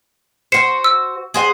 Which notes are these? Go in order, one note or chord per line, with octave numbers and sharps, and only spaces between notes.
F#4 C5 C7 C#7 E7
E6
G#4 C5 F#5